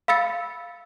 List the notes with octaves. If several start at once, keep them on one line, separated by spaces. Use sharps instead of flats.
F5 B5 E6 A6 C#7